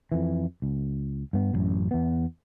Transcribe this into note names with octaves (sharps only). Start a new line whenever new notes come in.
F2 E3
C#2
G2 B3
A1 F#2 C3
E2 B3